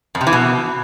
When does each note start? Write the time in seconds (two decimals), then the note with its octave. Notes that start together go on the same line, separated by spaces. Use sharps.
0.15 F2
0.21 C3
0.27 E3
0.33 B2